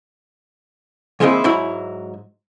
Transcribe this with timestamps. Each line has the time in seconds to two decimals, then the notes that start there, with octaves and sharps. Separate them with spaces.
1.20 E3 G#3 A#3 C4 D#4 E4
1.44 G#2 F#3 E4 E5 B5